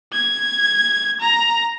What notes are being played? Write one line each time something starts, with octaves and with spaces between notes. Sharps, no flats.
G#6
A#5